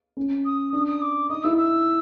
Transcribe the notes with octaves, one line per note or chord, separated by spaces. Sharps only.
C#4
D#6
D4 D#6
D#6
D6
D#4 D#6
E4 E6
E6